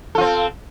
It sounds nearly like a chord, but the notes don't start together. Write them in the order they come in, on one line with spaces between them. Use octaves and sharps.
A4 F4 C4